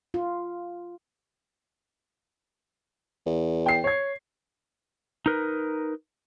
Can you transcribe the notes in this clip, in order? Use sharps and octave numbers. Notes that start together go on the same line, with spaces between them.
F4
E2
G5 C7
C#5 G#6
D#4 A#4 B4